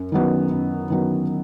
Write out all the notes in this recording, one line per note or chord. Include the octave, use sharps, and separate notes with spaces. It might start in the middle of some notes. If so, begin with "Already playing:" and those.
Already playing: F#2
D#3 F#3 B3
F#2
D#3 F#3 B3